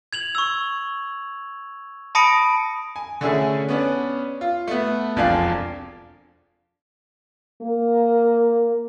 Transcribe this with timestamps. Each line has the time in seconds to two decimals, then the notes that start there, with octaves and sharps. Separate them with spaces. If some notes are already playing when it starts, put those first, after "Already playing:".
0.13 G#6 F7 F#7
0.35 C#6 E6
2.15 A5 B5 D#6 A#6 C#7 D7
2.96 G#5
3.21 D3 A3 C#4 E4 G#4
3.68 B3 C#4 D4
4.41 F4
4.68 A3 B3
5.16 E1 F2 D4 F4 F5 G#5
7.62 A#3